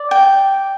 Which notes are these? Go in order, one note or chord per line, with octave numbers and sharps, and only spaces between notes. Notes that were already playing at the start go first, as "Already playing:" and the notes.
Already playing: D5
G5